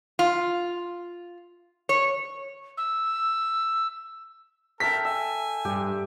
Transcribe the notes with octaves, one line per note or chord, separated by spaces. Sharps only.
F4
C#5
E6
A4 A#4 E5 G5 A5 B6
E5 G#5
G2 G4